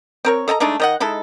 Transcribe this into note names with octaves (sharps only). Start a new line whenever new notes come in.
C4 A#4 C#5
A4 D#5 G#5 A#5
G#3 A3 D4 D#4
D#3 D#5 F#5
G#3 D#4 E4 A4